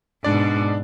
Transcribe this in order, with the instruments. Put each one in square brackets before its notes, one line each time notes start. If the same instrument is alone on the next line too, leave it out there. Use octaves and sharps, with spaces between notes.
[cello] G#2 B2 [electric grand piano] D4 D5